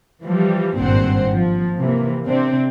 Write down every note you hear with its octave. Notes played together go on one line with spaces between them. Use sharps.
E3 F3 G3
G#1 G2 A#2 C4 C5 F#5
F3
C3 E3 A#3
C3 C4 D4